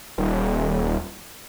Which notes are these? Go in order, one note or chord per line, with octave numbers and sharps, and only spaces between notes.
D#1